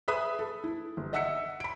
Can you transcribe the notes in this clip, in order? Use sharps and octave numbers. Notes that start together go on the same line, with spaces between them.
G#4 B4 E5 B5 D#6 F#6
A4
E4
G1
D#5 E5 F#5 E6 B6 C#7
B5 D7